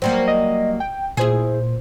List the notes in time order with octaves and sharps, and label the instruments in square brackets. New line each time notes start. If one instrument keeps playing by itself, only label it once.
[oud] F#3 G3 A#3 [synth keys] C5
[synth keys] D#5
G5
[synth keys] A#2 C5 [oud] E4 G#4